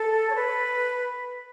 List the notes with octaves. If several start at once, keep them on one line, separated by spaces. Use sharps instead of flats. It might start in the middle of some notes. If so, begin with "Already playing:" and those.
Already playing: A4
C#5
B4